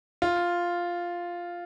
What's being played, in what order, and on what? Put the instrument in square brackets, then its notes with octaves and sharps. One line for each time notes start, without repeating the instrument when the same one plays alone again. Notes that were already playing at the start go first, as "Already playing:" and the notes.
[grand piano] F4